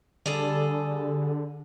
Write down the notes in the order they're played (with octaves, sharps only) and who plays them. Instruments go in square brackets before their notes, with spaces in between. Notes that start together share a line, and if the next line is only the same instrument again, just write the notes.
[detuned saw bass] D3 [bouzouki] G3 G#4 A4